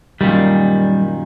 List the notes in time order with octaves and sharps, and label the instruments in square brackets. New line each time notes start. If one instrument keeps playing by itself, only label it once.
[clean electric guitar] F#2 A#2 D#3 [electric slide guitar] G3